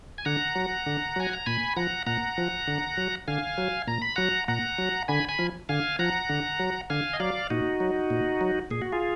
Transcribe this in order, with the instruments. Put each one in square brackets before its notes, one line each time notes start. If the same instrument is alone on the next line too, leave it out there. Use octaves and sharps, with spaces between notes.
[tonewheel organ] G#5
D3 F#5 A#5
F#3
D3
F#3 G#5
A#5
A#2 G#5 B5
F3 F#5 A#5
A#2 F#5 A#5
F3
D3
F#3
D3 F5 G#5
F#3
A#2 A#5
B5
F#3 F#5 A#5
A#2 F#5 A#5
F#3
D3 G#5 B5
G#5 B5
F3
D3 F5 G#5
F3 F#5 A#5
D3
F#3
D3 F5 G#5
D#5
F#3 D5 F5
A#2 D#4 F#4
F#3
A#2
F#3
A#2 G#4
F#4
F4 G#4